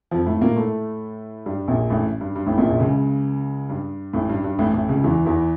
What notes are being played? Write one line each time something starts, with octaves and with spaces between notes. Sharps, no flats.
F2 F3
A2 A3
A#2 A#3
A2 A3
G2 G3
A#1 A#2
A1 A2
G2
G2
A1 A2
A#1 A#2
A#1 A#2
C#2 C#3
G2
A1 A2
G2
G2
A1 A2
A1 A2
C#2 C#3
E2 E3
E2 E3